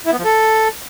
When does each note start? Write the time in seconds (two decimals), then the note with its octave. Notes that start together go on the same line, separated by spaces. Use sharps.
0.06 E4
0.12 B3
0.18 F3
0.25 A4